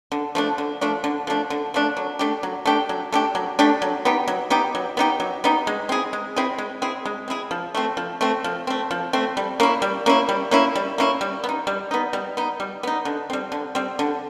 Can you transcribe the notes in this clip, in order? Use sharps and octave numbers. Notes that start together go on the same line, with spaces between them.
D3
F3 A3 D4
D3
F3 A3 D4
D3
F3 A3 D4
D3
F3 A3 D4
F#3
A3 D4 G4
F#3
A3 D4 G4
F#3
A3 D4 G4
F#3
A3 D4 G4
F#3
B3 D#4 G4
F#3
B3 D#4 G4
F#3
B3 D#4 G4
F#3
B3 D#4 G4
G#3
C4 E4 G#4
G#3
C4 E4 G#4
G#3
C4 E4 G#4
G#3
C4 E4 G#4
F3
A3 C4
F3
A3 C4
F3
A3 C4
F3
A3 C4
G3
A#3 C#4 E4
G3
A#3 C#4 E4
G3
A#3 C#4 E4
G3
A#3 C#4 E4
G3
B3
D#4
G3
B3 D#4
G3
B3 D#4
G3
B3 D#4
D3
G3 C4
D3
G3 C4
D3